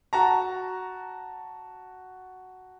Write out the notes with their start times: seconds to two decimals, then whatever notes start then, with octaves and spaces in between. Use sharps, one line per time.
0.13 F#4 A5 A#5